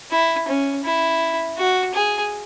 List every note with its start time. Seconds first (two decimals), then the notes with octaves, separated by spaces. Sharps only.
0.11 E4
0.48 C#4
0.84 E4
1.58 F#4
1.95 G#4